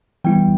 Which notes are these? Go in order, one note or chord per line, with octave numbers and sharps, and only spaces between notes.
E3 G3 B3 E4 G5